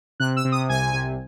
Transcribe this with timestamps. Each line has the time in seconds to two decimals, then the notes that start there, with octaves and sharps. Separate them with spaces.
0.20 C3 F#6
0.36 E6
0.45 C3
0.52 D#6
0.69 C2 G#5
0.94 C3